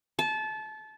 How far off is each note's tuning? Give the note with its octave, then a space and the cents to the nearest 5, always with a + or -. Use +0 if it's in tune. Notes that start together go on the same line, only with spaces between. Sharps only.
A5 -25